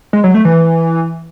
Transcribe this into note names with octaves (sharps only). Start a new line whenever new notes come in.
G#3
F#3
A3
E3